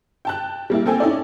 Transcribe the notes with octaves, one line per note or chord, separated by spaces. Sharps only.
G5 A5 F#6
G3 A#3 E4
A#3 C4 A4 G5 G#5
C#4 D#4 E4 A4 D5